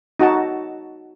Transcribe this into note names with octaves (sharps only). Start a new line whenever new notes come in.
D#4 F#4 F#5 A5